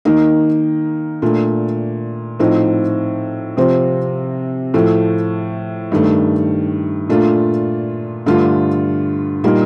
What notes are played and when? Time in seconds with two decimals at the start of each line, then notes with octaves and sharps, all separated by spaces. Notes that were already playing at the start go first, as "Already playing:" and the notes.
0.05 D#3 A#3 D#4
1.22 A#2 A3 D4
2.39 A2 F3 C4 D#4
3.57 C3 F3 C4
4.74 A2 F3 A3
5.92 G2 D#3 A3
7.09 A#2 A3 D4 F4
8.26 G2 D3 A3 D4 F4
9.44 A#2 G3 A#3 D#4